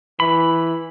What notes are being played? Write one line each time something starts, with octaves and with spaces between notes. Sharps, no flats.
E3 B5